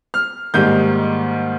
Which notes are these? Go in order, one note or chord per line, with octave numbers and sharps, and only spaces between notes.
F6
G#2 D#3 G3 A#3 G6